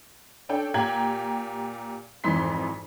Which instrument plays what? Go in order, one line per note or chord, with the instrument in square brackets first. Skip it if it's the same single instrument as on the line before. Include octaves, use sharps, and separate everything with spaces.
[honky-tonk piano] C#4 D4 A4 G5
A#2 G4 G5 A#5 G#6 F#7
G#1 F2 E3 D#4 C6 B6